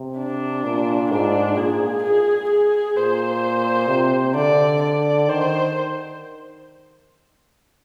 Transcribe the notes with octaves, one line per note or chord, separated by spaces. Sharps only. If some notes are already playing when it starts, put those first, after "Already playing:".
Already playing: C3
D4
A#2
G#2 D4
A#2 G#4
G#4
G#4
A#2 C5
C3
D3 D5
D5
D#3 C5